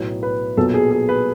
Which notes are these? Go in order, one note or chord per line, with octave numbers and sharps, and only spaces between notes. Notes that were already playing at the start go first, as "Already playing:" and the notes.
Already playing: B1 A2 F#3 B3
B4
B1 A#2 F#3 B3 A4
G#4
G#4
B4